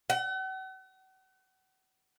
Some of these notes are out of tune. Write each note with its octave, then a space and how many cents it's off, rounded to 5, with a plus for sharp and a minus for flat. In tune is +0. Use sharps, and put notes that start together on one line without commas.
F#5 +40